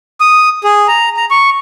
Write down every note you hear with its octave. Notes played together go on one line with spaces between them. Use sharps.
D#6
G#4
A#5
A#5
C#6